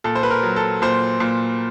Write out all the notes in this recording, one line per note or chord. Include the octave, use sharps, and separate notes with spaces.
A#2 A4
C5
B4
A#4
F#3
A4
A#2 C5
A#2